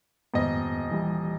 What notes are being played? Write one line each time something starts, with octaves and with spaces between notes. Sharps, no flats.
D#1 F2 G#2 B3 D#5
E3 G3